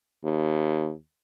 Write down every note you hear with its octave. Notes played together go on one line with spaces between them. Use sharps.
D#2